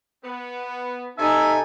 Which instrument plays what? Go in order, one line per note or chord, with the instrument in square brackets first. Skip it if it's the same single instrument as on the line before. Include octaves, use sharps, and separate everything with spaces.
[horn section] B3
[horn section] C3 A4 G#5 [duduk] D#4 [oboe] E5